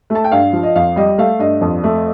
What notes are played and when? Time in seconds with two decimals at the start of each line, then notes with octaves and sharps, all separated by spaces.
0.10 A3
0.15 A5
0.24 G5
0.32 G2 F5
0.53 F3
0.63 D#5
0.76 F2 F5
0.96 G3 D#5
1.18 A3 F5
1.39 G2 D#5
1.61 F2
1.84 A3